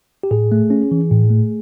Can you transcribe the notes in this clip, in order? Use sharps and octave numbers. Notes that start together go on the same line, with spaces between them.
G4
A2 G#4
A3
C#4
E3
A2
A3